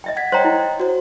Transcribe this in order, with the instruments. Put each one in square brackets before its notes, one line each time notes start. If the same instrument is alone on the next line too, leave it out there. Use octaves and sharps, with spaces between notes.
[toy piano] D#5 E5 G5
[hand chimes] F#5 G#6 B6
[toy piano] C5 C#5 A#5 [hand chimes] D#5 G5 C6
[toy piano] E4
[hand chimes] F#4 C5